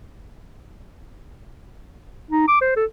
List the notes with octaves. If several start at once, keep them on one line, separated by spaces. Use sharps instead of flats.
D#4
D6
C5
A4